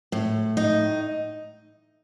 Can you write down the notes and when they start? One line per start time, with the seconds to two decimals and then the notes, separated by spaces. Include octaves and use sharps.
0.12 A2
0.57 D#4